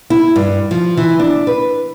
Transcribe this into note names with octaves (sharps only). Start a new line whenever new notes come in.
E4
G2
F3
E3
D4
B4